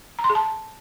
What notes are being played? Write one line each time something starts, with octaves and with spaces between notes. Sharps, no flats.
A#5
C6
G#4
A5